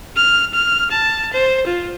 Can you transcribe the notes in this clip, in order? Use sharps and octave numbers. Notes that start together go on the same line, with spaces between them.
F6
F6
A5
C5
F4